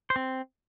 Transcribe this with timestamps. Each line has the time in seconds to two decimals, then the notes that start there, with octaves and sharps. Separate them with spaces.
0.10 C5
0.16 C4